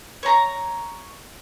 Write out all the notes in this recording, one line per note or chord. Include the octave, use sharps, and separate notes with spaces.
C#5 A#5